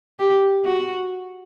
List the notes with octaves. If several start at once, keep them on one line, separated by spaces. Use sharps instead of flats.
G4
F#4